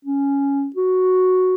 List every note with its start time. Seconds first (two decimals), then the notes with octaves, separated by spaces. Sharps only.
0.05 C#4
0.76 F#4